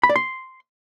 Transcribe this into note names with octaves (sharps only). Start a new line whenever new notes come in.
B5
D5
C6